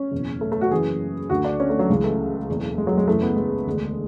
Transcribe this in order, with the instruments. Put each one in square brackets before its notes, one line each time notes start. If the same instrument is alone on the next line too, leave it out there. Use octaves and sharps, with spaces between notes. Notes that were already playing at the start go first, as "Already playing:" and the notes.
Already playing: [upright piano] C#4
F#1 E2 B2
A3
A3
F#4
F#1 F#2 E3 G#4
D2 D3 F#4
D4
C#4
A3
F#3
C#2 C#3 E3 G#3
A3
F#1 E2 B2
G#3
F#3
G#3
F#1 F#2 E3 A3
B3
G#3
E1 D2 D3